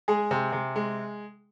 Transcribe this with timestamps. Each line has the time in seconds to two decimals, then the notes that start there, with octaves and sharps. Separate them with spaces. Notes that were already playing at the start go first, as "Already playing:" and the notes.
0.08 G#3 G#4
0.31 C3
0.52 C3
0.76 G#3